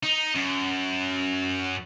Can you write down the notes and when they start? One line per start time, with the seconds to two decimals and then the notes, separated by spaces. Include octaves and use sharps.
0.03 D#4
0.35 F#2